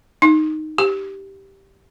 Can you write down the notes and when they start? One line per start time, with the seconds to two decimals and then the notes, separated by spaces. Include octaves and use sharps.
0.22 D#4
0.78 G4